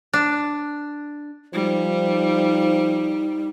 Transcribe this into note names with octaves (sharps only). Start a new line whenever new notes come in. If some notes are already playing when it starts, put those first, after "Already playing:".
D4
F3 G3 D#4